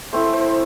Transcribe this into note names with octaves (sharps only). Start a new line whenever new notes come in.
A3 C4 E4 C5
C5